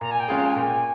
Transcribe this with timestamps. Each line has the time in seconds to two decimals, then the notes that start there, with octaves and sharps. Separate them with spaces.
0.01 A#2 A#5
0.11 G#5
0.20 G5
0.28 G#3 C#4 F4 G#4
0.38 A#5
0.46 G#5
0.54 A#2 G5
0.63 G#5